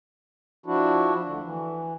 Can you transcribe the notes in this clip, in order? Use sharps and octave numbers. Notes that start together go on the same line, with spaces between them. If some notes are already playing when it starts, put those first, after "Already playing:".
F3 D4 E4 F#4
D2 D3
E3